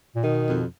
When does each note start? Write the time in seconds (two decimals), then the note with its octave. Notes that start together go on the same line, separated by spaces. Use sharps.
0.16 A#2
0.24 B2 D#3
0.47 F2